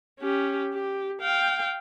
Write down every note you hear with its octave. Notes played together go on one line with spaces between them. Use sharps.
C#4 G4
G4
F5 G5